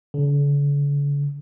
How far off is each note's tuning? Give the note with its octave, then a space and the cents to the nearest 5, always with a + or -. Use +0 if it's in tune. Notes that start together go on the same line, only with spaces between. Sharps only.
D3 -45